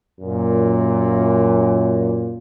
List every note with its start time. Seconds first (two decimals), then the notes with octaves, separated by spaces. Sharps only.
0.20 F#2 A#2